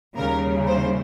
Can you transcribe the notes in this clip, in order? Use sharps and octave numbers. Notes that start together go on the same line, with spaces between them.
D#2 C#3 G3 A#4
C5